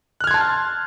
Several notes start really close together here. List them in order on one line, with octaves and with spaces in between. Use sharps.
F#6 F6 G#6 C6 A5